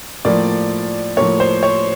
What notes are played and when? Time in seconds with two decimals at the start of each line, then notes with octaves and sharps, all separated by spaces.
0.25 A2 F3 A#3 D5
1.17 A2 F3 A#3 C#5
1.40 C5
1.63 C#5